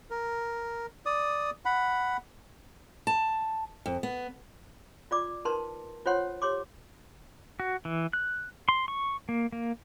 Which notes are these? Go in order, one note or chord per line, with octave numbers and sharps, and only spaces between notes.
A#4
D5 D#6
F#5 B5
A5
F2
B3
F4 D5 D6
D#4 A#4 B4 A5 C6
F4 C5 C#5 F#5 C6
G4 C#5 C6 D6
F#4
E3
F#6
C6
C#6
A#3
A#3